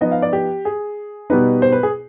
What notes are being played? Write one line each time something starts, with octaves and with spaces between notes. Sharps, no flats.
F3 B3 D#4 D#5
F5
D5
G4
G#4
B2 G3 B3 D#4 B4
C5
B4
G#4